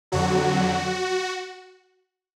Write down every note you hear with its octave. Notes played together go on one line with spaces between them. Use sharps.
F2 D3 F#3 F#4